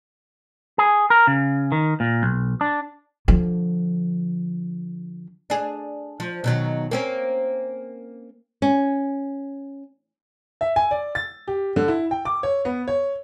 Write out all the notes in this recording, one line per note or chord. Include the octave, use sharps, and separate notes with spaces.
G#4
A#4
C#3
D#3
A#2
B1
D4
D3 F3
D4 G#4
F3
B2 D#3 F#3
A#3 C4 C#4
C#4
E5
G#5
D5
A6
G4
D3
E4
G5
D6
C#5
B3
C#5